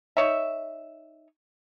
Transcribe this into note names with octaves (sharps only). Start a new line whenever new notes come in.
D#4 C#5 E5